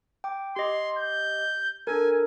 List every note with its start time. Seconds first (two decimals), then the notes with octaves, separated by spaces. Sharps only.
0.24 G5 D6
0.56 G4 D#5 C6
0.98 G6
1.87 D4 A4 A#4 G#5